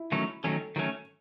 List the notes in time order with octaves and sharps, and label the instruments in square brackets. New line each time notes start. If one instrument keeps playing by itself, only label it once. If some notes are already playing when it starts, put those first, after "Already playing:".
Already playing: [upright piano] E4
[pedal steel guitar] D#3 F#3 A3 C#4
[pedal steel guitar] D#3 F#3 A3 C#4 [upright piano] A4
[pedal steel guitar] D#3 F#3 A3 C#4